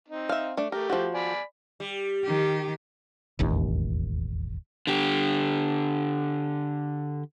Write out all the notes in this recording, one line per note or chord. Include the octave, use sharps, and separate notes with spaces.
C4 D#4
E5 F5
A3 D4
A3 G4 A#4
F3 F#4
D5 G#5 B5
G3
D#3 G4
E1 A1 D#2
D3 G4